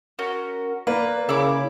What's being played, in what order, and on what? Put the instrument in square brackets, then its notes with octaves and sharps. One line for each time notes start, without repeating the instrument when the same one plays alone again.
[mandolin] C#4 F#4 [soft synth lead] A#4
[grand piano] A#3 [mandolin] B4 [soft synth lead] D5
[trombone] C#3 [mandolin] E4 B5 D6 [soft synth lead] A#4